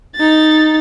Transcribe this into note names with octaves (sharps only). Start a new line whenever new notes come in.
D#4 A6